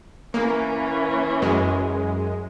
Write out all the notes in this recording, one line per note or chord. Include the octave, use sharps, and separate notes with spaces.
E3 A#3 C#4
F#2 G#3